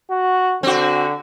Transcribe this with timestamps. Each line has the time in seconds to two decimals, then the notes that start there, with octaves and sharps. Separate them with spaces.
0.11 F#4
0.63 D3 C4 F#4